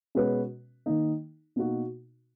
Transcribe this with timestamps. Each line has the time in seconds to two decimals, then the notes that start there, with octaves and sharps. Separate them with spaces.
0.15 B2 G#3 C#4 F#4 B4
0.86 D#3 A#3 D#4
1.56 B2 A#3 D#4 F#4